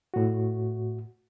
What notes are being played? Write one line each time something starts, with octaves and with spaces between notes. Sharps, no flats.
A2 F#4